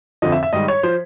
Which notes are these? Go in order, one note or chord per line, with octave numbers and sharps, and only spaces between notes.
F2 D3 F3 D#5
E5
E5
G#2 D#3 G3 D#5
C#5
F3 C5